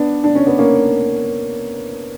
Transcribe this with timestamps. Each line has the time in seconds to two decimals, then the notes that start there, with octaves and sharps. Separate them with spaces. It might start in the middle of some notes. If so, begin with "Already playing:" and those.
Already playing: B3 D4
0.24 D4
0.35 C#4
0.47 B3
0.58 A#3 C#4